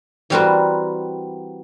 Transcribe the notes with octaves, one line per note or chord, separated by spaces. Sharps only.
E3 G3 C4 F#4 A#4 B4